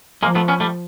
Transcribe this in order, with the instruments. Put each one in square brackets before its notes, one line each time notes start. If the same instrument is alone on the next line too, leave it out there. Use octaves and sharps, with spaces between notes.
[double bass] F3 [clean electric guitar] G#3 A#3
[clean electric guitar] A3 B3
B3 C#4
G3 A3